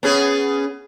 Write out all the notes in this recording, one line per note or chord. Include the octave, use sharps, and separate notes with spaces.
B3 C#4 G#4